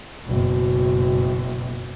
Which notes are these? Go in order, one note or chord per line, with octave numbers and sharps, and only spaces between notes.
F#1 B2